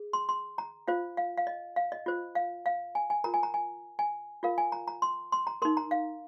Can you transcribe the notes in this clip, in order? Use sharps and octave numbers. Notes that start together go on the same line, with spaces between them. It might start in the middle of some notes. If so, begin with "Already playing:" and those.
Already playing: G#4
C6
C6
A#5
F4 C5 F5
F5
F5
D#5
F5
D#5
F4 C5
F5
F5
G#5
G#5
F4 A#4 A#5
G#5
A#5
G#5
G#5
F4 A#4 F5
G#5
A#5
A#5
C6
C6
A#5
D#4 A#4 C6
A#5
F5